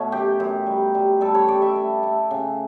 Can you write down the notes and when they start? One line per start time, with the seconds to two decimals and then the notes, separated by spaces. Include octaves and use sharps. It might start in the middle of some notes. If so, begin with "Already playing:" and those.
Already playing: B2 A3 C#5
0.12 F#2 G4
0.40 F#2
0.66 G3
0.95 G3
1.21 G3 A4
1.35 C#5
1.48 G3 D5
1.62 E5
1.76 A3
2.03 A3
2.31 C#3